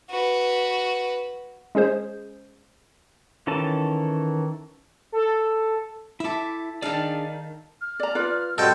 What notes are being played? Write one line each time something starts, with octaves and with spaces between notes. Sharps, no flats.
F#4 B4
G#3 C#4 G#4 C5
D#3 E3 C#4 A4 A5
A4
E4 A4 E5 D6
D#3 D4 G#4 A4 D5 F5
F6
D5 A#5
F4 B4 D5
G3 C4 F#4 A4 D#5 G5